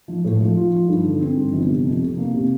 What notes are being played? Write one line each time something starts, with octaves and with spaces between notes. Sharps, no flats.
F3
A2
F3
F4
F3
G2
D3
C4
G2
G1
C3
F2
C3
A#3
C3